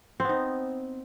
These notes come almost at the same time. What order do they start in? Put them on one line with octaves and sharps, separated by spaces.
C4 B3 D#4